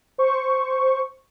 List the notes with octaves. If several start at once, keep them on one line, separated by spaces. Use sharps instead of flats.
C5 C#6